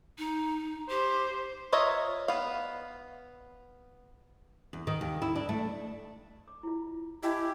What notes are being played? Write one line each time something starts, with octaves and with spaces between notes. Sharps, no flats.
D#4
G4 C5
F4 A#4 C#5 D#5 E5
B3 F5
E2
D#3
D#2
E4
D4
A3
D6
E4 F4
E4 G4 D#5 G#5 A5